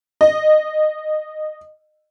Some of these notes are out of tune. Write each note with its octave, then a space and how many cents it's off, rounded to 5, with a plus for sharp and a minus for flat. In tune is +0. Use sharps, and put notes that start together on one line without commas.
D#5 -20